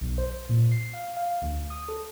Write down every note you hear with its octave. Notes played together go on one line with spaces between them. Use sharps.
B1
C5
A#2
C7
F5
F5
D2
D#6
A4